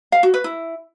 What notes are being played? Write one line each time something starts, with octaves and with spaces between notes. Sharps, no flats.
F5
F#4
B4
E4